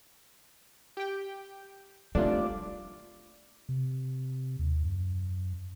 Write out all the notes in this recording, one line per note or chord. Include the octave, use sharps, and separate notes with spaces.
G4 G5
D#2 C3 G3 A3 D4 F4 D5
C3
D#2
F#2